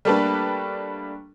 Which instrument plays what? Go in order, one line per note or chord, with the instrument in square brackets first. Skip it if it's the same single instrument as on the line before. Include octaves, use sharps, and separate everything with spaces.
[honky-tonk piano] G3 A3 A#3 D4 A4 B4